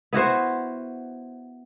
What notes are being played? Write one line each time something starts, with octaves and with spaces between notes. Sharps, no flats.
B3 E4 F#4 C5